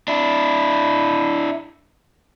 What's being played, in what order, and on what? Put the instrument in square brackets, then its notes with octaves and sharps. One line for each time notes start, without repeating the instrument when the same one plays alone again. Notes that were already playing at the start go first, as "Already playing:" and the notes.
[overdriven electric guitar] D4 E4